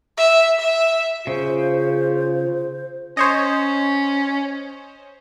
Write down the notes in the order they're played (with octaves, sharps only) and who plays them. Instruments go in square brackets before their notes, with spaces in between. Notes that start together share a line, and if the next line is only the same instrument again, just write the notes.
[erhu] E5
E5
[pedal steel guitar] C#3 [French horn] F4 [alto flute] C5
[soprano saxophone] C#4 [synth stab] C5 C#5 D#5